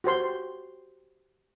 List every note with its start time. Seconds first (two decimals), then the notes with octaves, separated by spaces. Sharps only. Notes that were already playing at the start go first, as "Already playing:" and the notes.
0.04 F#4 G4 C5 C6